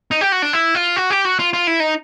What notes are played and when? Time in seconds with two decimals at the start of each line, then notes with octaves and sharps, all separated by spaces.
0.11 D#4
0.21 G4
0.32 F#4
0.42 D4
0.53 E4
0.75 F4
0.96 F#4
1.10 G4
1.25 F#4
1.39 F4
1.53 F4
1.67 E4
1.80 D#4